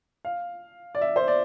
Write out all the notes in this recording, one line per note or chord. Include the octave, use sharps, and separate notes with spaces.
F5
D5
E5
C5
D5